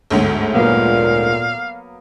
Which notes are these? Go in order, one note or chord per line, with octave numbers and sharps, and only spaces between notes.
G1 D2 G#2
A#2 F#3 A#3 B3 F5